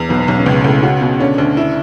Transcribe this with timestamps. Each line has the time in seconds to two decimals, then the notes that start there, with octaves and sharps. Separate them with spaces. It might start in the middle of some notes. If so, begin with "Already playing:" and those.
Already playing: E2
0.09 B1 B2 B3
0.19 B3
0.28 B1 C#3 C#4
0.38 C#4
0.46 C#2 B2 B3
0.64 C#2 A2 A3
0.83 C#3 C#4 F#4
1.01 B2
1.20 D3 C#4 D4
1.38 D2
1.57 E4